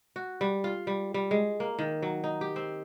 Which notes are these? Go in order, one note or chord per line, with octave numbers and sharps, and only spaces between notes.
F#4
G3
F4
G3
G3
G#3
A#3
D#3
F#3
D#4
G4
C4